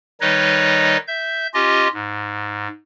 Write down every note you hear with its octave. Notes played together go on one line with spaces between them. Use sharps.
D#3 G3 D#4 B4 C#5 D#5
E5 G6
C#4 F4 G4 D#5
G#2